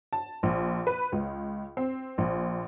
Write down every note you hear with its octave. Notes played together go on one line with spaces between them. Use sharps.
A5
A#1
B4
C#2
C4
A#1